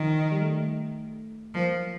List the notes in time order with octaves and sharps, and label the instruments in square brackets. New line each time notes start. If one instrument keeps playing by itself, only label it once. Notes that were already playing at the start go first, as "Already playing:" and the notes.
Already playing: [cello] D#3 [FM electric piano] F3
[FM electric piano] G3
A3
[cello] F3 [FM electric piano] A#3